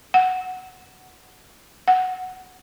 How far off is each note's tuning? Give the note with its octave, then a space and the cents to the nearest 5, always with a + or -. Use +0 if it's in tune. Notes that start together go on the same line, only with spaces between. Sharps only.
F#5 +0
F#5 +0